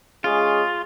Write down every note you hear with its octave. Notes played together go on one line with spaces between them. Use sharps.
G#3 C#4 F4 G#4